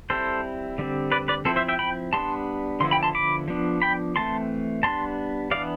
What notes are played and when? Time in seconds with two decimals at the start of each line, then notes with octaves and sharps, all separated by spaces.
0.10 G3 C4 E4 A4 C5
0.78 D3 G3 C4
1.12 B4 D5
1.28 B4 D5
1.45 F3 C4 E4 A4 C5
1.56 C5 E5
1.68 E5 G5
1.79 G5 B5
2.13 G3 B3 D4 A5 C6
2.80 D3 F3 B3 E4 C6
2.91 G5 B5
3.03 A5 C6
3.15 B5 D6
3.48 F3 B3 D4
3.82 G5 B5
4.16 E3 A3 C4 A5 C6
4.83 G3 B3 D4 A5 C6
5.51 E3 B3 D4 D5 F5